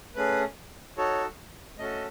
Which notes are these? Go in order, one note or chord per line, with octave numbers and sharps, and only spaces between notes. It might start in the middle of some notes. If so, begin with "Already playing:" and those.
A3 C#4 G#4 B4
D#4 F#4 A4 C#5
A3 C#4 F#4 A4 D#5